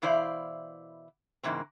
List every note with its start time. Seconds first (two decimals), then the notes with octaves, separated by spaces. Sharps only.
0.02 B2 E3 E4 C5 D5 F5
1.43 G#2 C#3 E3 A#3 C4